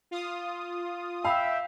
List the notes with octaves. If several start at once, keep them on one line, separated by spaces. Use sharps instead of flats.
F4 D#6
E5 F5 G5 B5